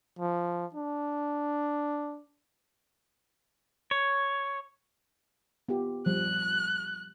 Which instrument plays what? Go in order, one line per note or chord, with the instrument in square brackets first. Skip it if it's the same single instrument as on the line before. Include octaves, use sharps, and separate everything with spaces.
[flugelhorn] F3
D4
[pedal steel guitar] C#5
[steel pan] B3 F4 G4
[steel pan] F3 G3 [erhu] F#6